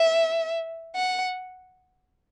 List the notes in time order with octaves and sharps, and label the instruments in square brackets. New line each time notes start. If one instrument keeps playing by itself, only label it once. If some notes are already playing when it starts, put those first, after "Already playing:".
Already playing: [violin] E5
F#5